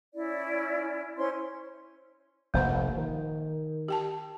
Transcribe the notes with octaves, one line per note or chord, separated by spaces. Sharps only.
C#4 E4 D5
C#4 E4 C5 C6
F1 A#1 A#3 C5 F#5
D#3
G4 G5 A5